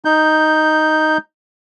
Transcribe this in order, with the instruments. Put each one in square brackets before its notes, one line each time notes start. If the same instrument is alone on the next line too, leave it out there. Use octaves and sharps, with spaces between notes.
[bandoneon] D#4 G6